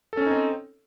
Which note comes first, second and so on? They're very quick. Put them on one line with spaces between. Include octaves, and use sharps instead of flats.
A4 C#4 C#5 D#4 C4